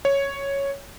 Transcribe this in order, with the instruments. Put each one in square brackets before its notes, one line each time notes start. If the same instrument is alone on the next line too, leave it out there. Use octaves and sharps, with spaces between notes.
[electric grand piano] C#5